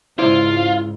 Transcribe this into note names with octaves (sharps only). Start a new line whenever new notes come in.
C#2 G#2 E4 F4 C5 D5